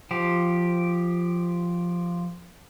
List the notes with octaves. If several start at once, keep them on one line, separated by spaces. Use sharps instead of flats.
F3 G4